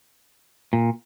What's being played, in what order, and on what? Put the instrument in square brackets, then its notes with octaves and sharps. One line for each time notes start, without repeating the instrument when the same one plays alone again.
[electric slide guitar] A#2